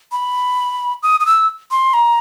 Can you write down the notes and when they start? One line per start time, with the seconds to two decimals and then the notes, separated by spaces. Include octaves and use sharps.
0.12 B5
1.03 D#6
1.20 D#6
1.26 E6
1.71 C6
1.94 A#5